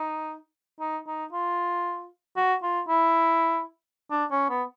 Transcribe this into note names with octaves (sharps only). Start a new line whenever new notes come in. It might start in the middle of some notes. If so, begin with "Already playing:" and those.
Already playing: D#4
D#4
D#4
F4
F#4
F4
E4
D4
C#4
B3